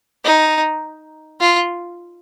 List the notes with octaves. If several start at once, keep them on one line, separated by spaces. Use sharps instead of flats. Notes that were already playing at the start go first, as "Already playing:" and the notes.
D#4
F4